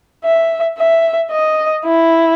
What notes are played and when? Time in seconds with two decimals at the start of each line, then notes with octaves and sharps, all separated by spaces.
0.24 E5
0.78 E5
1.32 D#5
1.85 E4